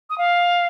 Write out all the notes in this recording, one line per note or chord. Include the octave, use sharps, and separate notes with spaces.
D#6
F5